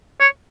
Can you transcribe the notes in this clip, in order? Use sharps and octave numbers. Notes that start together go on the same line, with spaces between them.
C#5